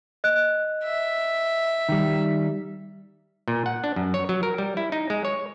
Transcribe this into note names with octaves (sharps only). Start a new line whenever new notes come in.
D#5 F#6
E5
D#3 G3
A#2
F#5
D4
F#2
C#5
F#3
A#4
G3
E4
D#4
G#3
C#5